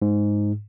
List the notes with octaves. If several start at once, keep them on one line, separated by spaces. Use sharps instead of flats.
G#2